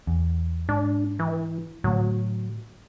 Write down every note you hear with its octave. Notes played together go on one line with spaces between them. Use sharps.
E2
G#2 D4
E3
A2 D3 F#3 A3